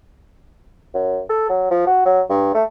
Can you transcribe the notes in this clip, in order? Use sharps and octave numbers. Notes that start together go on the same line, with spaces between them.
F#2
A4
F#3
F3
F#4
F#3
G2
A3